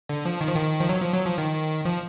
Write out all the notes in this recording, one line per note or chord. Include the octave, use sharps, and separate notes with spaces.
D3
F3
D#3
F3
D#3
F3
F#3
F3
F#3
F3
D#3
F3